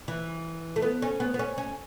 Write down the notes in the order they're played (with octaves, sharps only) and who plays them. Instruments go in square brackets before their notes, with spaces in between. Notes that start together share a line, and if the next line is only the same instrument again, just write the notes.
[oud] E3
A3
B3
C#4
B3
B3
C#4
C#4